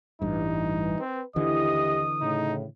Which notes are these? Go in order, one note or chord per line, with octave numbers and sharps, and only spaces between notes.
A1 G2 E3 G3 D#4
C4 B4
D#2 D3 E3 E4 G4 D#5 D#6
A2 C#3 D#4